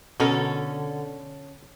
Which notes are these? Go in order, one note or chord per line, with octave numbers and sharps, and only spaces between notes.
B2 D3 C#4 A4 A#4